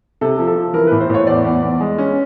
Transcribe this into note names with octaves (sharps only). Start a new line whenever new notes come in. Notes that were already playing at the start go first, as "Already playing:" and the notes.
C3 A4
F3
A4
F3
E3 A#4
B4
A2
C5
A2 C#5
E2 D5
E2
E2
G#3
C#4